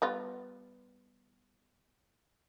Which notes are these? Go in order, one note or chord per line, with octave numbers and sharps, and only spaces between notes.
G3 B3 F4